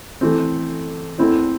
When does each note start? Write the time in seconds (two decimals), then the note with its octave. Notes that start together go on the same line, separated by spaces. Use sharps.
0.21 E3 A3 C4
1.18 E2 E3 A3 C4 E4